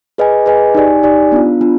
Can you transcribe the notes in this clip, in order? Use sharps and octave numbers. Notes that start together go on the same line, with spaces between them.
G#4 B4 D#5 G#5
G#4 B4 D#5 G#5
D#4 G4 D5 G#5
D#4 G4 D5 G#5
B3 D4 F4
B3 D4 F4